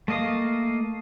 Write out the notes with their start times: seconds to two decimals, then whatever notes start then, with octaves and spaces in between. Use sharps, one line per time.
0.08 A3 A#3 D#5 F5 D#6